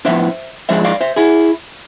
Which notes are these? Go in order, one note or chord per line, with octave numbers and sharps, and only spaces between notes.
A2 F3 B3 D4 C5 E5
G#2 F3 G#3 D4 C5 E5
D5 F5
C5 E5
E4 G#4